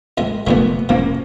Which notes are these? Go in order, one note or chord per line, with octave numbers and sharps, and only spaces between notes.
A#1 F2 G#3
F1 G2 A#2 A3 B3
E1 F3 A#3 C#4